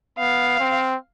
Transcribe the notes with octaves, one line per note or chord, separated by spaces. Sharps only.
B3 F5
C4